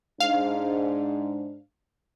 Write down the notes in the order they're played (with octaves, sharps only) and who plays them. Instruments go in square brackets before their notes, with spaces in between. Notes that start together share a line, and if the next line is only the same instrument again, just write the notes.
[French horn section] G#2 D4 [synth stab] F5